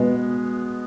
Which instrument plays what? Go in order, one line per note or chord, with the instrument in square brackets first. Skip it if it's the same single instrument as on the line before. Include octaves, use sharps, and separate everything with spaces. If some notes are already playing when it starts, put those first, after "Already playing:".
Already playing: [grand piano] B2 G#3 B3